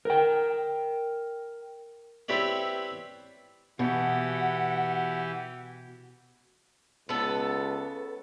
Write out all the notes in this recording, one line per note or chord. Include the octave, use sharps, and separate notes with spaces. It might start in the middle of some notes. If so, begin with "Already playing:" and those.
A#4 G5
C4 E4 G4 B4 C#5 D5
B2 E3 G4 F#5
C#2 B3 A4